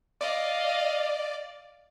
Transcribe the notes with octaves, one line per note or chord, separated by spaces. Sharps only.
D5 D#5 F5